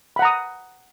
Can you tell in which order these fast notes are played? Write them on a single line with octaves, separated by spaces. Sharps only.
B5 F#5 A#5 D#6